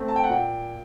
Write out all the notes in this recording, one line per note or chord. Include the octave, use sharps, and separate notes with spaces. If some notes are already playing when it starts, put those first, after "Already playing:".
Already playing: A3 C4
A5
G5
F#5
A#2 G5